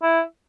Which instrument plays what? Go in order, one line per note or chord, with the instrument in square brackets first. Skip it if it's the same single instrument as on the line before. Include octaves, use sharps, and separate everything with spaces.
[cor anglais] E4